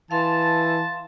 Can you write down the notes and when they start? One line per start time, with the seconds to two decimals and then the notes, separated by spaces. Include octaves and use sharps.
0.11 E3 F5 A5 C6